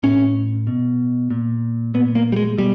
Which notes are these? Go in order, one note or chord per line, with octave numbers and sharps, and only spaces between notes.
A2 C#4
B2
A#2
A#2 B3
A#3
G3
G#3
B2 G3